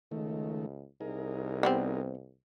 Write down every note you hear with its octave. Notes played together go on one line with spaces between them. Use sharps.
C#2 D#3 A3
C2 D#4 G#4 A#4
G3 B3 C4